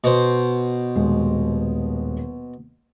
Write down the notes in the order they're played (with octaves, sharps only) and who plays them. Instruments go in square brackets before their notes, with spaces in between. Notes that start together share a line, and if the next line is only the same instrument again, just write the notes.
[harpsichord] B2 C5
[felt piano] D#1 G#3